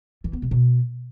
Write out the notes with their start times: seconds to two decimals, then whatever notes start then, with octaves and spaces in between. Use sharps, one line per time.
0.24 E3
0.33 B3
0.42 C3
0.51 B2